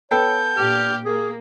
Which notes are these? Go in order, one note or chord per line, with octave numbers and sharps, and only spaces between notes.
B3 A4 C#5 G5 G6
A#2 D4 G4 F6
A#3 G#4